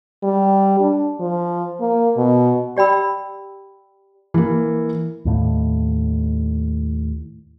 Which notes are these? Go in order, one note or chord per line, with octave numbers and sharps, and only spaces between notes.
G3
D4
F3
A#3
B2
G4 D5 G5 B5 E6
E3 A#3
D#2 A2